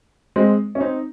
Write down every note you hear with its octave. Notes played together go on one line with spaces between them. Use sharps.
G#3 C4
C#4
C4 D#4